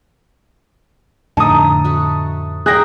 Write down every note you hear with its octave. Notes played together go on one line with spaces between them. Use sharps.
F2 A2 D3 D#4 A5 D#6
A3 F#4
G3 A#3 G#4 A#4 G5 F#6 A#6